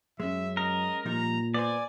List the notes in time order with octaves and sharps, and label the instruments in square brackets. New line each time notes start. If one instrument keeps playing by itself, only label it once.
[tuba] F#2 [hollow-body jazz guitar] G#3 C#4 [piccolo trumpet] E5
[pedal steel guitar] A#4 [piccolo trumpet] D#5
[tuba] A#2 [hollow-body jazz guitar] F3 G3 D#4 [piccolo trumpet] A#5
[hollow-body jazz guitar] B3 C5 [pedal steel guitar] D5 [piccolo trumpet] G#5